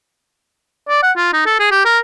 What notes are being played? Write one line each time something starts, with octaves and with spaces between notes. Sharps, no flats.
D5
F#5
F4
D#4
A4
G#4
G4
A#4